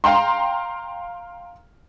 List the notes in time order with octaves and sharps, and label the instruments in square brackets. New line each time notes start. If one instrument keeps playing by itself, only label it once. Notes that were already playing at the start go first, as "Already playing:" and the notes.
[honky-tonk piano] F5 G5 A#5 C6